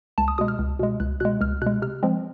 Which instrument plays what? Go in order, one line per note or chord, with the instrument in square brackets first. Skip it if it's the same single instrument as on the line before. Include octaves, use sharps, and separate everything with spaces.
[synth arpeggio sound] C#2 A5
D#6
B2 G#3 D#6
F6
C#2
B2 G#3
C#2 F#6
B2 G#3 F#6
C#2 F6
B2 G#3 F#6
C3 F6
F3 G#3 C4